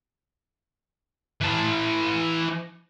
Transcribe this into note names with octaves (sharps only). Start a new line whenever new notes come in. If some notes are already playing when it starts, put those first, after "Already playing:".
E3 A5